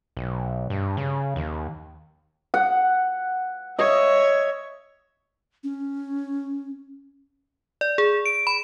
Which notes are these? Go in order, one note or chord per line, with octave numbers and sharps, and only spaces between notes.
B1
G2
C#3
D#2
F#5
C#5 D#5 E5
C#4
D5
G#4
D7
B5